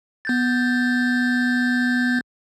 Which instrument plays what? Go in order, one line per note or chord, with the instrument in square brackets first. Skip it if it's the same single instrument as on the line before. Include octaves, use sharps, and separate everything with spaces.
[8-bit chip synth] B3 G6 A6